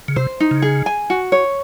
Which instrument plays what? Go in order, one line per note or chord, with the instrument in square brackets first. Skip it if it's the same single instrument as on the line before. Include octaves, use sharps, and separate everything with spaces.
[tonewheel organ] C#3
[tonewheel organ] C3 [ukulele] C5
[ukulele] D#4
[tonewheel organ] C#3
[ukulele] G#4
G#5
F#4
C#5